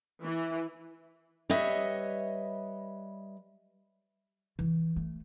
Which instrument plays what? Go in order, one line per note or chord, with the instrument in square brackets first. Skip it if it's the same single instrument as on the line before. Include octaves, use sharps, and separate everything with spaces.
[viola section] E3
[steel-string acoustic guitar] G3 B4 C#5 D#5 E5
[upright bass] E3
A3